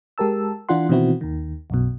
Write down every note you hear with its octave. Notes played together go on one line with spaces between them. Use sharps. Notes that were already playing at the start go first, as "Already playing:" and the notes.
G#3 G4 A#4 A5 E6
E3 D4 F4 F#5 C6
B2 D#3 E3 C4 E4 F#4
D#2 D#3
B1 F#2 B2